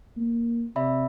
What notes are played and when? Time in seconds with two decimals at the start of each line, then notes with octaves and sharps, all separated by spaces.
0.17 A#3
0.76 C3 D5 E5 B5